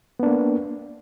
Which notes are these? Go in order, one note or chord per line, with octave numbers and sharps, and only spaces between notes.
A#3 B3 D4